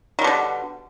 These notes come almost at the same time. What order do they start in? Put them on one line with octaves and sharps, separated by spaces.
D#3 G3 B2 D3